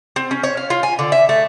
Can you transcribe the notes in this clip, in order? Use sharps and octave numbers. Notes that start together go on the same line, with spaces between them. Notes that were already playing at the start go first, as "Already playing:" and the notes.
C4
C#4
C#5
F5
F4
G#5
D3
E5
A3